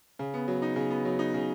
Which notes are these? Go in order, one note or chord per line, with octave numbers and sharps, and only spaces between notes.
C#3
B3
F#3
D#4
C#3
B3
F#3
D#4
C#3